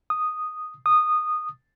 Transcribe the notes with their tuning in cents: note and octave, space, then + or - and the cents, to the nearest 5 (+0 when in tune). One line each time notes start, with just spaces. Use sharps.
D#6 -5
D#6 -15